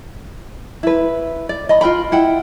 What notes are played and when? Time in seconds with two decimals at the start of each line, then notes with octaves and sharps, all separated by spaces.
0.83 E4 B4
1.49 D5
1.69 D#5 B5
1.81 F4 A#4 G5 B5
2.12 E4 F#5 G5